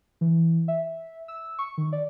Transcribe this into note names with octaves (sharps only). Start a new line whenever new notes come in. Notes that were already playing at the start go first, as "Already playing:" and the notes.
E3
E5
E6
C#6
D#3
D5